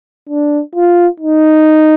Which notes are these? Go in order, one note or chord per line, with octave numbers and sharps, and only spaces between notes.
D4
F4
D#4